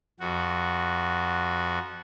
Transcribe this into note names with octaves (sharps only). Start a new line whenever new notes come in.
F2 F#4